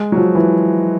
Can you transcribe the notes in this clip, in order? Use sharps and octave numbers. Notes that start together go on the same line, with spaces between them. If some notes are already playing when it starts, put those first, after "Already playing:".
Already playing: G#3
F#3
F3
E3